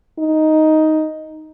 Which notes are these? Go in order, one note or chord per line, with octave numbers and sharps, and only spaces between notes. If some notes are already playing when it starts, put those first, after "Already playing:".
D#4